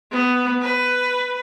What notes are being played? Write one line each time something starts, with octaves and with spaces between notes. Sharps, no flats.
B3
B4